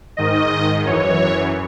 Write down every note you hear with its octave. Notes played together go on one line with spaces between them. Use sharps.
G#2 D#3 D#5
F#2 E3 C#5